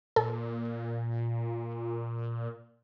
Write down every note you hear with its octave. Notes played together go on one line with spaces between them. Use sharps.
A#2 A4